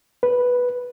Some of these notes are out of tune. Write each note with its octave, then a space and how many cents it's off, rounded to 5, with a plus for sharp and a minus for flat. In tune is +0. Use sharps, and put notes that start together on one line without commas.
B4 -5